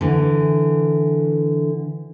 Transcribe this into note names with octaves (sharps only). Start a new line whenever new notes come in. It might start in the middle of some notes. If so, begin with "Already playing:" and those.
D3 E3